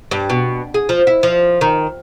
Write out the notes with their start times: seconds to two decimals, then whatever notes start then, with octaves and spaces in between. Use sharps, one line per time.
0.11 G2
0.30 B2
0.74 G#4
0.89 F3
1.07 E4
1.23 F3
1.61 D#3